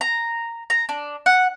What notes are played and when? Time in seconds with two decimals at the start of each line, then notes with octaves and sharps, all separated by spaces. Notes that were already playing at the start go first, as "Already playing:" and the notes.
0.01 A#5
0.70 A#5
0.89 D4
1.26 F#5